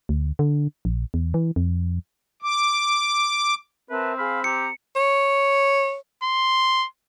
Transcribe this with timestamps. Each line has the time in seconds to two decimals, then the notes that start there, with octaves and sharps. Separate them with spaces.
0.09 D2
0.39 D3
0.85 A#1
1.14 E2
1.34 E3
1.56 F2
2.42 D6
3.90 C4 A#4 B4 E5 A5
4.18 G#4 F5 B5 F6
4.44 G4 A#5 C#7
4.96 C#5
6.23 C6